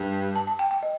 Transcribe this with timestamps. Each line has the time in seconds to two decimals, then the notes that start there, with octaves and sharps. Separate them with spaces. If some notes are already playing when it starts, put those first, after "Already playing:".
Already playing: G2
0.36 A5
0.47 A5
0.59 G5
0.71 G5
0.83 D#5